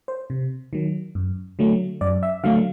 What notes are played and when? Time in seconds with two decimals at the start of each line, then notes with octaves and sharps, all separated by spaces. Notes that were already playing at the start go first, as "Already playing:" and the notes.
0.08 C5
0.30 C3
0.73 D#3 F#3
1.15 F#2
1.59 D3 F#3 A3
2.01 F#2 D5
2.23 E5
2.44 D3 F#3 A3 F5